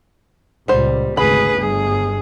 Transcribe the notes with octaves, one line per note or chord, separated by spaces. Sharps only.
C#2 A#2 G3 C5
G#1 D2 C#3 G#4 B4 B5
G1 G#4